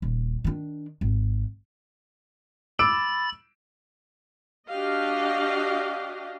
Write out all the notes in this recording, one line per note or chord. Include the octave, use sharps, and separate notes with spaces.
D#1
D#3 D4
G#1
B5 D6 E6 A6 D7
D4 F#4 G4 D#5 F5